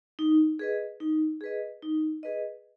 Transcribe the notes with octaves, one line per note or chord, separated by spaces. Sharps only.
D#4
G#4 B4 D#5
D#4
G#4 B4 D#5
D#4
G#4 B4 D#5